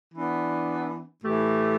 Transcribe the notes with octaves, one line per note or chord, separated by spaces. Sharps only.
E3 B3 D4
A2 E3 A3 G4